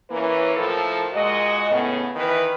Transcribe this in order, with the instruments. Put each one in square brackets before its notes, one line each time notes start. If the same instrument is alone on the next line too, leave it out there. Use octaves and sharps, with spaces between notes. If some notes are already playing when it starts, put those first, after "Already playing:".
[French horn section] E3 A#3 C#4 E4 B4 C#5
A2 F3 A4 A#4
A#2 G#3 F#4 D#5
A2 C#3 B3
D#3 E3 E4 B4